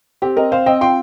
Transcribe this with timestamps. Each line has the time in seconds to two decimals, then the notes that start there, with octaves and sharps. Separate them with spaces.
0.22 C4 G4
0.37 C4 A#4 D#5
0.51 C4 C5 F5
0.66 C4 D#5 G5
0.81 F4 G5 C6